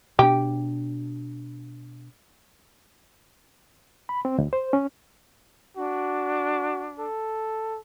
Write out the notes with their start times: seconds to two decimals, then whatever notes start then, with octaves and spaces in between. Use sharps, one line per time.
0.19 B2 D4 G4
4.09 B5
4.25 C4
4.38 D2
4.53 C5
4.73 C#4
5.77 D4 F#4
6.99 A4